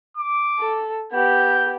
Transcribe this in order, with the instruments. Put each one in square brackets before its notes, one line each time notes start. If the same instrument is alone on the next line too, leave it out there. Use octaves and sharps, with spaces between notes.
[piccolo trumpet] D6
[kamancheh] A4
[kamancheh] B3 G4 [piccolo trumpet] G6